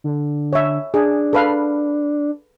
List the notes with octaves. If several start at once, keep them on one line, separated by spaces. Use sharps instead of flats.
D3
C#5 E5
D4 G#4
A4 B4 F5